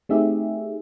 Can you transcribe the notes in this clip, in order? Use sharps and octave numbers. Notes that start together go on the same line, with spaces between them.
A3 C4 D#4 G4 G#4 E5